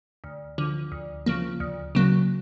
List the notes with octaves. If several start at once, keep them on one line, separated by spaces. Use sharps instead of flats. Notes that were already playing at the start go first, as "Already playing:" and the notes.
D2
D3 F3
D2
C#3 F3 A#3
D2
C#3 F#3 A#3